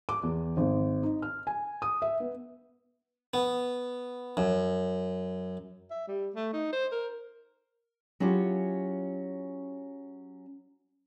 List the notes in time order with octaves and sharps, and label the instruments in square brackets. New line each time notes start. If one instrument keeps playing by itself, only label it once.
[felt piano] D6
E2
G#1
D#4
F6
G#5
D#6
E5
B3
[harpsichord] B3
F#2
[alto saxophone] E5
G3
A3
D#4
C5
A#4
[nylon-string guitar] F#3 C#4 E4 F4 G4 G#4